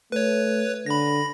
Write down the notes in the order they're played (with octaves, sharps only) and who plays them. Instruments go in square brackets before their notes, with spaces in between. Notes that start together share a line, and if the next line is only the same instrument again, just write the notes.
[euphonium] A3 [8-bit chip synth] B4 C#5
[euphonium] D3 [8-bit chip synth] B5 A#6